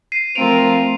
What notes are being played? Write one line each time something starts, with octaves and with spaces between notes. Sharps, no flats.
C7 D#7
F3 A3 C4 F4 A#4 D7 F7